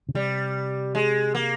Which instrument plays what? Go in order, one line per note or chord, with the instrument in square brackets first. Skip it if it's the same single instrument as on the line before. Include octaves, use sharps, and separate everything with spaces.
[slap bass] C#3
[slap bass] C3 [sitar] G3
[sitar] G#3
A#3